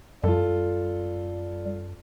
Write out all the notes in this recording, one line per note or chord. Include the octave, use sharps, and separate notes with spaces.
F#2 G3 F4 A4